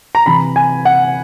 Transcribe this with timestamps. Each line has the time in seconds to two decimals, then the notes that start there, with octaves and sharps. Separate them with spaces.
0.15 A#5
0.26 C3 E3 B5
0.56 G#5
0.85 F#5